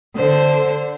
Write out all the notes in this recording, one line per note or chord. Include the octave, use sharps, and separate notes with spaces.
D3 C5